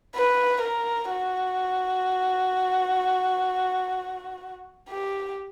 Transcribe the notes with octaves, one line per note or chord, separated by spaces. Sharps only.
B4
A#4
F#4
G4